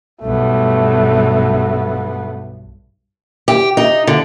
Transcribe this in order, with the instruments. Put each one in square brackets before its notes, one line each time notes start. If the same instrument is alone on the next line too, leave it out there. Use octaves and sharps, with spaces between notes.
[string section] B1 G2 [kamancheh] A3 [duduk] B3
[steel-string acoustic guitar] G4
D#4
D3